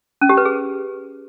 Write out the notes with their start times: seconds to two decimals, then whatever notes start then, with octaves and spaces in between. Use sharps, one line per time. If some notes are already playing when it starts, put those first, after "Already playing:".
0.21 C#4
0.29 G4
0.37 B4
0.45 G#4